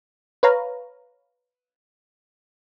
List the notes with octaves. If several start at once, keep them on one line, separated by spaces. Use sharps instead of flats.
B4 C#5 F5 A#5